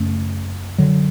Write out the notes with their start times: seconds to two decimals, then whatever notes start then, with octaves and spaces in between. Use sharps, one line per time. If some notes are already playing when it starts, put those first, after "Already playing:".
Already playing: F#2 C#3 A3 C#4
0.78 D3 F#3